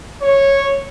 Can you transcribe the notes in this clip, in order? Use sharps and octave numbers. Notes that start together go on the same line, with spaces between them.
C#5